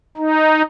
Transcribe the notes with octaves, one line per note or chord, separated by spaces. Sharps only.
D#4